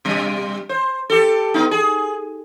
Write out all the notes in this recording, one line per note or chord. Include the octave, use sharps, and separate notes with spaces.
B2 G3
C5
G4 A4
B3 D#4
G#4